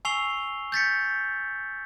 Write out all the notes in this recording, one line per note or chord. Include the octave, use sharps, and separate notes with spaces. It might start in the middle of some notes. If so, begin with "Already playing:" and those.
G#5 C#6 E6 C7 F7 G7
G6 A6 B6 C#7